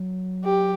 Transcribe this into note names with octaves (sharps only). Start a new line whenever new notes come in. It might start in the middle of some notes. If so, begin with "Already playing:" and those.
Already playing: F#3
G4